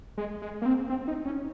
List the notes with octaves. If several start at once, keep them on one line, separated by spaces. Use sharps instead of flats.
G#3
G#3
A#3
C4
C4
D#4
C#4